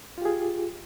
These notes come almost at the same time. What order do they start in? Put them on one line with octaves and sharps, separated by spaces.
F4 G4 G#4